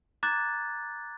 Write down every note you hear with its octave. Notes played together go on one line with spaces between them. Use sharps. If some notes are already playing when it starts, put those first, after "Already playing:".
A#5 D6 F#6 G#6 A6